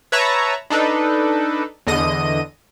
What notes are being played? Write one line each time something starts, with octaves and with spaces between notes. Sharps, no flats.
B4 C#5 E5 A5 A#5 C#6
D4 D#4 A4 B4
E2 D3 D#5 D#7